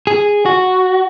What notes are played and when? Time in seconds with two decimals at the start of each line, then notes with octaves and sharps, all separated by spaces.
0.07 G#4
0.46 F#4